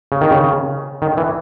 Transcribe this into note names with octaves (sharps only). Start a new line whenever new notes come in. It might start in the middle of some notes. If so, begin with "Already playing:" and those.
C#3
D#3
C#3
D#3
E3